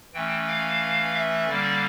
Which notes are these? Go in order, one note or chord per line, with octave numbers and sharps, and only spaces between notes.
E3 A3 C#4 G5
F5
E5
D3 G3 A#3 C#4 D5